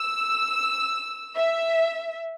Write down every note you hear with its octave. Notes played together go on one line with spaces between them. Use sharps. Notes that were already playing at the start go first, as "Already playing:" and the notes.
Already playing: E6
E5